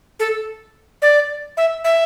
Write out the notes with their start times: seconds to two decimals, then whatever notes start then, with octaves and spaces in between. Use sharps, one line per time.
0.20 A4
1.02 D5
1.57 E5
1.84 E5